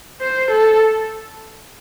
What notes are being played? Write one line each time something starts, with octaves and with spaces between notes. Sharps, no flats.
C5
A4